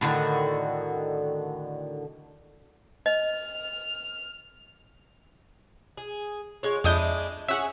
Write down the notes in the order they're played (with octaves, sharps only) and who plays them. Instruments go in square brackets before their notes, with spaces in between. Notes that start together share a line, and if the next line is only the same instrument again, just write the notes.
[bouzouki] A2 D3 D#3 F#4
[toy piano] D#5 [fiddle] F6
[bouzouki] G#4
G#3 F4 C#5
[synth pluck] F2 D#6 G6 [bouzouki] G#3 D4 E4
[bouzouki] C#4 F#4 G#4 [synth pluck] E5 F#5